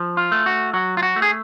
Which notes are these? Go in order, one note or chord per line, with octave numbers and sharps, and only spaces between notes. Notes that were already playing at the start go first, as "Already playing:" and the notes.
Already playing: F3
F4
A3
F#4
F#3 F#4
F4
F#4
A3
G#4